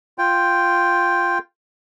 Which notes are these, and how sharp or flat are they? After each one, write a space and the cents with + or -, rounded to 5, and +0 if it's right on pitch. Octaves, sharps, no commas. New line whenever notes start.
F4 +0 G5 +0